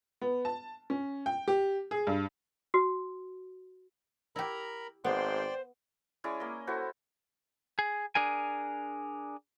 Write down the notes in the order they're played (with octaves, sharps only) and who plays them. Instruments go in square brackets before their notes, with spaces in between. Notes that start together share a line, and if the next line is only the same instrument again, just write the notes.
[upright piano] B3
A5
C#4
G5
G4
G#4
G2
[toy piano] F#4
[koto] E4 G4 [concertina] A#4 A#5 B5
[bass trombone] G#1 [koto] B3 [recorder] C5 [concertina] D5 G5 C6
[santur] G#3 C#4 E4 D5
A#3 D#5
E4 F#4 A4 C5
[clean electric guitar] G#4
D4 G#4 A#4 G#5